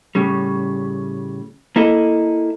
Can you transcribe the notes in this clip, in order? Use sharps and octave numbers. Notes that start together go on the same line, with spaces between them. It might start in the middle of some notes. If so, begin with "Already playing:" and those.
A2 C#3 G3
A#3 E4 A4 D#5